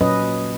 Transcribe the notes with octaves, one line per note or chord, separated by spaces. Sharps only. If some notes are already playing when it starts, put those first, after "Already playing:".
A#2 F#3 C#4 B4 D#5